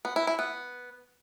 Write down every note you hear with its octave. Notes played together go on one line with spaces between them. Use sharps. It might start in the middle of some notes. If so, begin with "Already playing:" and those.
B3
E4
E4
B3